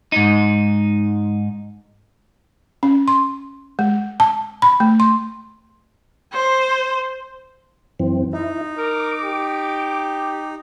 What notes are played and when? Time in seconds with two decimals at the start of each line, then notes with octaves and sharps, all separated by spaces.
0.12 G#2 D#4
2.83 C#4
3.08 C6
3.79 G#3
4.20 A5
4.62 B5
4.80 A3
5.00 C6
6.33 C5 C6
8.00 F#2 E3 C4
8.33 D#4 E4
8.78 A#4 D6
9.24 G4